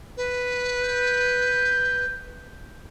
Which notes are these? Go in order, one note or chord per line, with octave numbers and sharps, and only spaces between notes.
B4
G6